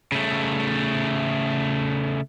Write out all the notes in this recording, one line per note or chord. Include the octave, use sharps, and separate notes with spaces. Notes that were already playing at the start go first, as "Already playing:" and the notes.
C#3 A3